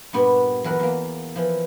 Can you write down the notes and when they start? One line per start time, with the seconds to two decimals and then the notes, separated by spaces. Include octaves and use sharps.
0.13 G2 A#2 B3 F#4 G4
0.64 E2 F#3 A#4 B4 F#5
0.79 E2 A#3
1.35 E3 F3